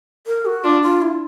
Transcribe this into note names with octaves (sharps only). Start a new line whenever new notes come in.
A#4
F#4
D4 F4
F4
E4